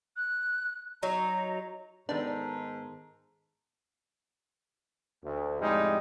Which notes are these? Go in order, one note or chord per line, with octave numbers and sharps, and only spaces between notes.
F#6
F#3 D#4 A#5
G#2 D#3 B3 D4 D#4 A4 A#4
D2
F2 A2 G3 G#3 D#4